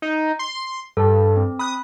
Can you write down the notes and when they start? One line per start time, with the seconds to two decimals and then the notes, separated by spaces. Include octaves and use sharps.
0.02 D#4
0.39 C6
0.97 G2 A4 A5
1.37 C4
1.59 B5 D#6 F#6